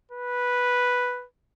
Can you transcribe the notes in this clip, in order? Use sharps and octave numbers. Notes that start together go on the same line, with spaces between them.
B4